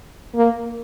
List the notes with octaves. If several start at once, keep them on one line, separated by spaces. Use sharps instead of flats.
A#3